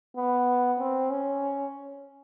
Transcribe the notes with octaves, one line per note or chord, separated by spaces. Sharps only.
B3
C4
C#4